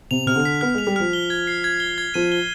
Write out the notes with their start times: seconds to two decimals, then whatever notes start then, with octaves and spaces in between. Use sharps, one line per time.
0.11 C3 F7
0.27 C3 F6
0.36 D3
0.45 B6
0.61 B3 F6
0.75 G#3 F7
0.87 G3
0.96 F3 F6
1.13 G7
1.30 G#6
1.47 C7
1.64 G#6
1.80 G7
1.98 G#6
2.14 F3 D#7
2.32 G7